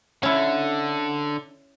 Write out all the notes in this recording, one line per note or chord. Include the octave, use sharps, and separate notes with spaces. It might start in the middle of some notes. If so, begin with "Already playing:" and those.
D3 C#4 E4